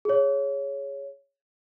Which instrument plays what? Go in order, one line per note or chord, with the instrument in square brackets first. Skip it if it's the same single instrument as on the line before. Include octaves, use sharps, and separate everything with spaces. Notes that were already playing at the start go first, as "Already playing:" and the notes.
[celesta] G#4 C#5